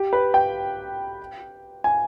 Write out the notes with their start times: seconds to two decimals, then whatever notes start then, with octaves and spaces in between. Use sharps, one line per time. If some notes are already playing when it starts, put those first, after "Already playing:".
Already playing: G4
0.13 B4
0.34 G5
1.84 G#5